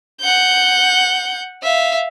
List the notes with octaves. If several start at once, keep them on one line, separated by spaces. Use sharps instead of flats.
F#5 G6
E5 F5